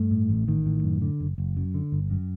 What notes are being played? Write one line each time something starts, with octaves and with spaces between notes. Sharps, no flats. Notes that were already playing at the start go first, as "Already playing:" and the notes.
Already playing: G2 A3
A2
A1
A1 D#3
A2
F#2
D3
F#1
F#1
F#2
D3
G1
F#2